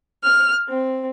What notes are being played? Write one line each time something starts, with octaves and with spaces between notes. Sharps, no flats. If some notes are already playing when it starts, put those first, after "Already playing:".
F6
C4